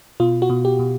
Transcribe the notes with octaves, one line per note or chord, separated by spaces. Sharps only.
B2 F4
F#4
B2
G4
B2